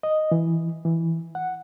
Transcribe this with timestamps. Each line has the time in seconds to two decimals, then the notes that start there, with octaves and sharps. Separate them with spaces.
0.03 D#5
0.32 E3
0.85 E3
1.35 F#5